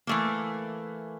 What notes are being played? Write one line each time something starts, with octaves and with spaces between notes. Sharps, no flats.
E3 A3 A#3